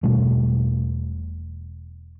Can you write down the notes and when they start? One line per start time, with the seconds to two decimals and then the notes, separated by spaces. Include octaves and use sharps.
0.03 E1 B2 G3 A3